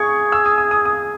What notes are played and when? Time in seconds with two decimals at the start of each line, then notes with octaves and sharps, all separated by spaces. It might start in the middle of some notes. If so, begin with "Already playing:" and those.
Already playing: G#4 C#6
0.32 E6
0.46 D#6
0.58 D#6
0.71 D#6
0.85 D#6